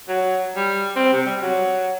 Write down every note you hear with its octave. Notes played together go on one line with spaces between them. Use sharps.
F#3
G3
C4
C3
G3
F#3